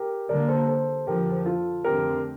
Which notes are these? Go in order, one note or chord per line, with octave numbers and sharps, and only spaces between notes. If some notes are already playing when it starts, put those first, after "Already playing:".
Already playing: G4 A#4
D3 G3 A#3 A#4 D5
A4 C5
A4 C5
F2 D3 F3 G4 A#4
F4 A4
F2 D3 A3 C4 G4 A#4